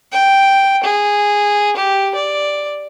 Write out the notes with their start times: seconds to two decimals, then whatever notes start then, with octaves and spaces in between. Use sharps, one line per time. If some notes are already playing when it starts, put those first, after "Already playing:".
0.12 G5
0.83 G#4
1.76 G4
2.15 D5